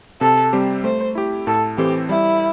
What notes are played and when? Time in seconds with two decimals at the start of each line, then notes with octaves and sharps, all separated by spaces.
0.21 C3 A4
0.53 G3 C4 G4 C5
0.84 A3 C5
1.15 E4 G4
1.47 A2 A4
1.78 E3 C4 G4 A4 C5
2.09 G3 E4